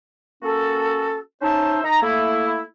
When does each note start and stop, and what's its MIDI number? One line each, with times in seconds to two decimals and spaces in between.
0.43 1.18 58
0.43 1.18 61
0.43 1.18 66
0.43 1.18 69
1.42 1.79 61
1.42 1.79 63
1.42 1.79 72
1.42 1.79 76
1.42 1.79 81
1.84 2.02 63
1.84 2.02 82
2.03 2.62 57
2.03 2.62 58
2.03 2.62 64